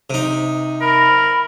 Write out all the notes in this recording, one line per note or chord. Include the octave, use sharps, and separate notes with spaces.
C3 D#4
A#4 B5